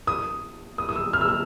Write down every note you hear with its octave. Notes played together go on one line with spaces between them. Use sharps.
D#6
D#6
D#6
E6
F6
E6
F6